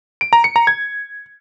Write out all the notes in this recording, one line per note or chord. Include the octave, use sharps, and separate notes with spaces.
D7
A#5
C#7
A#5
G#6